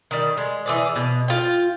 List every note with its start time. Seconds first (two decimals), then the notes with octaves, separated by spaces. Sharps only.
0.11 D#3 G3
0.38 G#3
0.66 E3 G#4 D5
0.96 B2
1.28 F4 G5